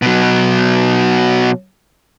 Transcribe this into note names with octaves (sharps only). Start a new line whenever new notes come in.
B2 F#3